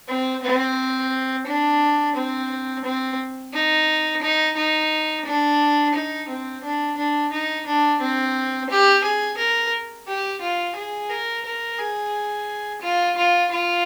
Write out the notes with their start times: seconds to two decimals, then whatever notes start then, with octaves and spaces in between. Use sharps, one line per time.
0.08 C4
0.43 C4
1.47 D4
2.15 C4
2.84 C4
3.53 D#4
4.22 D#4
4.57 D#4
5.25 D4
5.94 D#4
6.29 C4
6.63 D4
6.97 D4
7.31 D#4
7.66 D4
8.01 C4
8.69 G4
9.04 G#4
9.38 A#4
10.08 G4
10.41 F4
10.76 G#4
11.10 A#4
11.45 A#4
11.79 G#4
12.82 F4
13.17 F4
13.51 F4